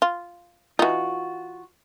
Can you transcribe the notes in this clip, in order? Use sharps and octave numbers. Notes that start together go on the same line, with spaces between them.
F4
E3 D#4 F4 F#4